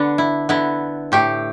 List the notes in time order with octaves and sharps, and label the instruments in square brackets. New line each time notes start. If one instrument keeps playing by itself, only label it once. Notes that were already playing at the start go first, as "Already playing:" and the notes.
Already playing: [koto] D3 B3 D4
E4
D3 B3 E4
A2 A3 G4